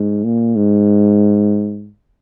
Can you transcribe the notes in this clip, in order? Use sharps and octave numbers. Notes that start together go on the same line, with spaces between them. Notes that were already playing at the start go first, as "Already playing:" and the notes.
Already playing: G#2
A#2
G#2